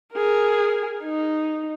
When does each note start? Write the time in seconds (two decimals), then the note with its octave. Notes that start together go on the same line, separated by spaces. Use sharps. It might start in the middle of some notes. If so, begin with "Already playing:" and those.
0.14 G#4 A#4
1.03 D#4